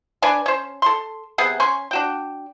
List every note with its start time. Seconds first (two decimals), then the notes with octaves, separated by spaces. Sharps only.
0.22 D4 B4 D5 G#5
0.46 C#4 C5
0.82 A4 C6
1.38 C3 B3 G#4 F#5
1.60 C#4 G#5 C6
1.91 D4 F#4 G5